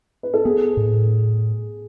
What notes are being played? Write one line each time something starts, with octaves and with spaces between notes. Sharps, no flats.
B4
A4
B3 G#4
A2